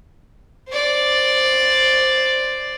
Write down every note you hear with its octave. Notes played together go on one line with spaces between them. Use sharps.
C5 D5